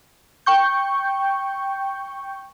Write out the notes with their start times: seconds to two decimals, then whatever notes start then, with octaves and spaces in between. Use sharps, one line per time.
0.46 G5 C#6 G6